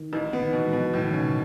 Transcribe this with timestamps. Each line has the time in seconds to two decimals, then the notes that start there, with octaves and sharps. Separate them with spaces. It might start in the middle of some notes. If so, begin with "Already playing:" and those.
Already playing: D#3
0.13 A1
0.33 B3
0.42 D#3
0.53 B2 E3
0.67 G#3
0.73 B2
0.80 F#3
0.94 A2 E3
1.03 D#3
1.13 C#3 C#4
1.23 B2